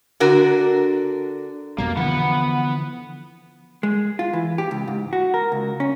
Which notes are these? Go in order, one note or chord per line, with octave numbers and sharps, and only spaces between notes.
D3 D4 F#4 A#4
F2 B2 G3 A#3
D3 E3 F3 B3 F#5
G#3
F4
E3
G4
C#2
G#2
F#4
A#4
C#2
C#4